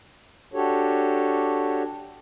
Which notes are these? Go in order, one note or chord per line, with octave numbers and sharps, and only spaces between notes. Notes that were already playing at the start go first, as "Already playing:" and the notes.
D4 F#4 G4 A4 C#5